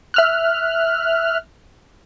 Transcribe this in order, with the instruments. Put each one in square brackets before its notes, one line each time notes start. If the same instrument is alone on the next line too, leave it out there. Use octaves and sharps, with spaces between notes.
[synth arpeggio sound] E5 F6 F#6